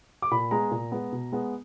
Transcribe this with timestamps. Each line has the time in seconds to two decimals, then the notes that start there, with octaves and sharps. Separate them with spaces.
0.22 D6
0.31 A#2 B5
0.51 G#3 B3 A#5
0.71 A#2
0.92 G#3 B3
1.12 B2
1.32 G#3 B3